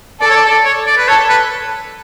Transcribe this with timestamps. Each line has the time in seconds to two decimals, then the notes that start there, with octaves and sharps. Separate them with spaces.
0.21 A4 D5
0.30 C#5
0.36 D5
0.51 D5
0.65 C#5
0.87 D5
0.98 B4
1.08 A4 C#5
1.29 B4